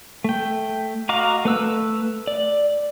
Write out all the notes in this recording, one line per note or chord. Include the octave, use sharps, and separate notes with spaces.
A3 G5
F#4 D#5 F5 A#5 D6
A3 B4 E6 F#6
D5